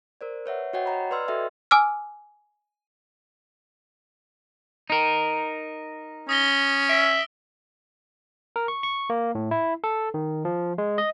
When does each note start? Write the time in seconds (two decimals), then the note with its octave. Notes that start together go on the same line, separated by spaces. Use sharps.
0.21 A#4 C5 D5
0.46 B4 C#5 E5 F#5
0.73 F#4 C5 C#5 D#5 F#5 G5
0.86 D#5 A#5 B5
1.11 B4 D5 C6 E6 F6
1.28 F#4 A4 D#5 E5 G5
1.71 G#5 D6 E6 F6
4.90 D#4 A#4
6.29 C#4 D#6 A#6 G7
6.89 E5 E6 D7
8.56 A#4
8.68 C#6
8.83 C#6
9.10 A#3
9.35 A2
9.51 E4
9.84 A4
10.14 D#3
10.45 F3
10.78 G#3
10.98 D#5